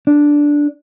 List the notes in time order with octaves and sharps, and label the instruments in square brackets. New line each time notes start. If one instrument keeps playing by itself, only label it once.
[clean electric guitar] D4